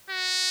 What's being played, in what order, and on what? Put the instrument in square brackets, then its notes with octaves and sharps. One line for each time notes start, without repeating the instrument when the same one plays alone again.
[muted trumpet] F#4